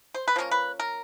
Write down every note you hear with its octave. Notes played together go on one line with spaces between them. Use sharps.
C5
B4
F3 A#3 C#4 A#4
B4
A#4